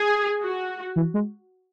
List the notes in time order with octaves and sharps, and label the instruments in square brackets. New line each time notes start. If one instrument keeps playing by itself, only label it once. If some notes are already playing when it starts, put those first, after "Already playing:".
Already playing: [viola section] G#4
F#4
[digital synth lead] E3
G#3